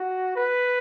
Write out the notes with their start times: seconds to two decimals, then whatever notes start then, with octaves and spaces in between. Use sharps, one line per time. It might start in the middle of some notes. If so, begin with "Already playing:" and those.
Already playing: F#4
0.36 B4